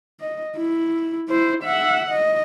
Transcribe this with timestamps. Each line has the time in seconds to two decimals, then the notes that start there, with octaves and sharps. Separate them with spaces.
0.20 D#5
0.57 E4
1.28 E4 C5
1.63 E5 F#5
2.11 D#5